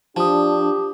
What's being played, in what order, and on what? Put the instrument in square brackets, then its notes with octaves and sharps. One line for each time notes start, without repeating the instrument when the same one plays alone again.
[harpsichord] F3 [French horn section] D4 [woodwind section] G4 [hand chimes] A5 D#6